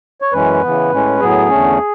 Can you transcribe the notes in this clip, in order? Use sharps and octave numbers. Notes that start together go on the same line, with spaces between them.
C#5
F#2 E3 G#3 C#4 B4
C#3 E3 B3
A2 G#3 C#4
A2 F#3 B3 G#4
E2 D3 A3 C#4